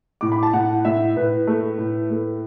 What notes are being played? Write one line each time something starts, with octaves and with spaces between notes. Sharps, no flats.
A2 D6
B5
A5
A2 F#5
A2 E5
A2 B4
A3
A2
A3